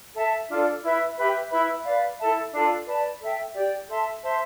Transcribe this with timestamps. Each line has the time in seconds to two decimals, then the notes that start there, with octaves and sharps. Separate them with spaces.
0.14 A4 E5 A5
0.48 D4 F4 A4 D5
0.82 E4 B4 E5
1.16 G4 B4 E5 G5
1.50 E4 B4 E5 B5
1.85 B4 D5 F5
2.19 E4 A4 E5 A5
2.53 D4 F4 A4
2.86 B4 D5 A5
3.20 A4 E5 G5
3.54 G4 D5 G5
3.88 A4 E5 A5 C6
4.22 C5 E5 A5 C6